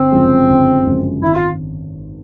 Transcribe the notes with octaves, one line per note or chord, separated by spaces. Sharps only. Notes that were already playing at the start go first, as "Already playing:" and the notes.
Already playing: G1 C4
F#2 C#3 F3 G#3
G1
F#2 C#3 F3 G#3
G#1 E4
F4